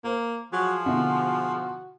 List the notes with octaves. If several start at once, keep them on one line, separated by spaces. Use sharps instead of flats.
A#3 C5
F3 F#3 G#4
B2 D3 E4 F#4